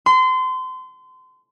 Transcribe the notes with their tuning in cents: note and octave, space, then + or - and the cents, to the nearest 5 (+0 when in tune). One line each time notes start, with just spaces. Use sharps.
C6 -30